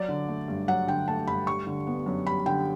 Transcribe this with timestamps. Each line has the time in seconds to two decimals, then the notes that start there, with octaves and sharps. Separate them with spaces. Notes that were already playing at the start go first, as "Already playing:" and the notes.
Already playing: F#3 D5
0.09 D3
0.28 A3
0.48 G2
0.68 F#3 F#5
0.88 D3 G5
1.08 A3 A5
1.27 G2 B5
1.47 G3 C#6
1.67 D3
1.87 B3
2.06 F#2
2.26 G3 B5
2.46 D3 G5